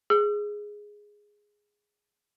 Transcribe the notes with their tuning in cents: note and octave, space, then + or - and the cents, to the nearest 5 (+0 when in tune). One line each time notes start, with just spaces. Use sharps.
G#4 +0 E6 +45